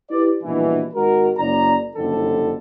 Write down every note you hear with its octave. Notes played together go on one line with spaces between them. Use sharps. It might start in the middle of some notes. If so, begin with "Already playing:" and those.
E4 G4 B4 D5
A#1 G2 B2 E3
G#1 G#3 F#4 A#4
F#1 C#4 D5 A#5
F#1 C2 F2 D3 A4